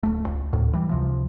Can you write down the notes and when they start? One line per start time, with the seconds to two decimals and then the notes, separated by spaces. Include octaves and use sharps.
0.03 D1 A3
0.27 C#2
0.53 D2 A2
0.73 E3 G3
0.89 C#2 C3 F3